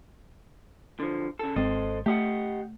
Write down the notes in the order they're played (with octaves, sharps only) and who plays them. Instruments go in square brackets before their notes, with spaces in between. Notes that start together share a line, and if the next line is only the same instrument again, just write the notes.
[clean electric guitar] D3 F3
C#3 A4
[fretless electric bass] G#1 C4 [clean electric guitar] A4 C5 D#5
[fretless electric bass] A3 [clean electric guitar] G4 D#5 F#5